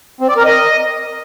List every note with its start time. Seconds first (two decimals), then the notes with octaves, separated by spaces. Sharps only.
0.21 C4
0.29 D5
0.37 A#4
0.45 D#5